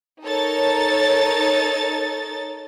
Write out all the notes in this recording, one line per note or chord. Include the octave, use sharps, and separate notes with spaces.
D#4 A4 A#4 C#5 A6